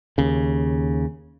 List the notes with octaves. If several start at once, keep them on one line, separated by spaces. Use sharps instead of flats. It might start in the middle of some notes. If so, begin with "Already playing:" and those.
D#2 C#3